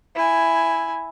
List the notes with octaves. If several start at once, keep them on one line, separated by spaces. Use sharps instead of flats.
E4 G#5